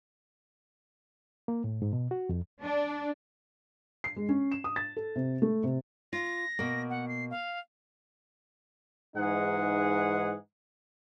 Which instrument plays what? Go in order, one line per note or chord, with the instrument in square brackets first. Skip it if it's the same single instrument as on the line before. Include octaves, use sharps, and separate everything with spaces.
[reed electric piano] A#3
A2
G#2
B2
F#4
F2
[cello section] D4
[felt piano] C7
G#3
C#4
E7
D#6
A6
A4
C3
A3
C3
[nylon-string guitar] F4 [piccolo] A#6
[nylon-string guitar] B2 A#3
[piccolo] F#5
C7
F5
[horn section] G#2 E3 D#4 G#4 F#5